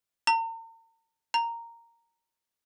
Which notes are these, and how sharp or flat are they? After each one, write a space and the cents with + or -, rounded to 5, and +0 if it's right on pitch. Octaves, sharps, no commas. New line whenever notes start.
A#5 -45
A#5 -10